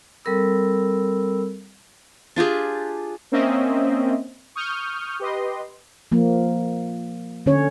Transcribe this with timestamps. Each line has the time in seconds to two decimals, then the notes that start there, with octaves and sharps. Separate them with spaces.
0.25 G3 C4 A4 A#4 B5 E6
2.36 D4 F4 G4 G#4
3.32 A#3 C4 C#4 D#5 E5
4.55 C#6 D#6 F6 G6
5.20 G4 B4 D#5 C6
6.12 F3 A#3
7.46 D3 C#4 C#5